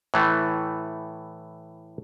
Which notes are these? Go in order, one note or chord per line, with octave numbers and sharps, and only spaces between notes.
A2 E3 A3